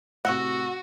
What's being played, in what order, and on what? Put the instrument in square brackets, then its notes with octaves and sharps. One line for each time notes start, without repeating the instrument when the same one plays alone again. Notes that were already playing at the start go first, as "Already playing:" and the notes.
[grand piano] A2 C3 C4 [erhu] F#4 [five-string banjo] F#5 [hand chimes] C#6 E6 A#6